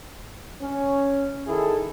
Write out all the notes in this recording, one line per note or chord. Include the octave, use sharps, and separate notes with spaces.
C#4
D#3 E4 G#4 A4